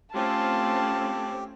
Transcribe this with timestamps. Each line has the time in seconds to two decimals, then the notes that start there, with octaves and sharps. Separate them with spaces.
0.15 A3 C4 C#4 F4 G4 A5